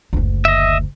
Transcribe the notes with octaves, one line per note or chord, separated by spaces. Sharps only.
F#1 D2
D#5 E5